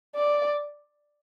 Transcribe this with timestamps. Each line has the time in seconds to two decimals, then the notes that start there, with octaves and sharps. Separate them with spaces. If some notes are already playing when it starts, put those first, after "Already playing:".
0.16 D5